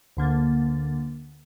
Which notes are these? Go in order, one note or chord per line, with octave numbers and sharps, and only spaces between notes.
D2 D3 A#3 A6